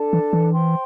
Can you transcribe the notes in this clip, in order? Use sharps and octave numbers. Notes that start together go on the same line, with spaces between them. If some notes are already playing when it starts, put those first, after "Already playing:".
Already playing: D4 A4 D5 A5
E3
E3
C5 G5 C6